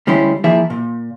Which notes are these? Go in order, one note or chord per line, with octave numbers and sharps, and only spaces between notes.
D2 G3 G#3 C#4 E4 C6
F3 A#3 E4 G#4 E5
A#2